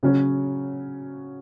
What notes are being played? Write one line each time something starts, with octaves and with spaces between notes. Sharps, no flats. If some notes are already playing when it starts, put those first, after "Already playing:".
C#3 F#3 C#4 F#4